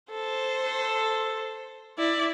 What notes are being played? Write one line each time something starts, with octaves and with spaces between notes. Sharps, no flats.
A4 C5
E4 D5